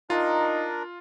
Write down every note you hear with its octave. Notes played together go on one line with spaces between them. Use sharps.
D4 D#4 F4 A#4